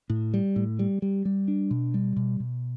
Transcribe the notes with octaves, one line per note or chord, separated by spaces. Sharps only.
A2
G3
A2
G3
G3
G3
D4
B2
G3
B2
B2